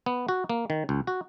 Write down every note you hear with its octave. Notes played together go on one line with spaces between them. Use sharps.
B3
F#4
A#3
D#3
C#2
F#4